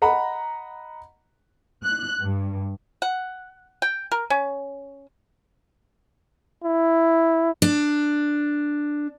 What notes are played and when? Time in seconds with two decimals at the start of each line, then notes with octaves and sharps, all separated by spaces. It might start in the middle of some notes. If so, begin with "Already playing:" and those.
0.02 D#5 F#5 A#5 B5
1.83 F#6
2.21 G2
3.02 F#5
3.82 G5
4.12 A#4
4.30 C#4
6.64 E4
7.62 D4